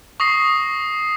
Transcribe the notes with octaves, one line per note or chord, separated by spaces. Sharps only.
C#6 D#6 A#6 C7